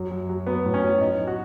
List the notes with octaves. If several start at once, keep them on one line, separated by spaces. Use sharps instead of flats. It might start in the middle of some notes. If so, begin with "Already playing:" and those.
Already playing: F#2 F#3
F#3
F#3
F#3 B3
A2
C#4
F#3
F#3 D#4
F#3
F#4